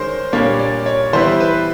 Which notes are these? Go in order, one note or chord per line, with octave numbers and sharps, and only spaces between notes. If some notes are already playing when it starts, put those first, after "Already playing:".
Already playing: D#3 G#3 C#4 A#4 C5
A#2 G3 A#3 D4 C#5
D5
C#5
E3 G3 B3 E4 C5
B4